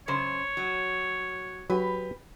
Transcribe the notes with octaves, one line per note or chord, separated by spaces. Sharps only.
F#2 C#3 C5 C#5
F#3
F#3 F#4 G4 B4